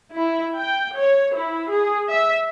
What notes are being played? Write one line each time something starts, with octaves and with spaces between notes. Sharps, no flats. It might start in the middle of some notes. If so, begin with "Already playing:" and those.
E4
G5
C#5
E4
G#4
E5